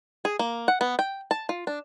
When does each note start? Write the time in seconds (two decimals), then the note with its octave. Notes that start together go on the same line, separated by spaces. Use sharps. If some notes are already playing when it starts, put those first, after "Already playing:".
0.25 G#4
0.39 A#3
0.68 F#5
0.81 B3
0.99 G5
1.31 A5
1.49 F4
1.67 D4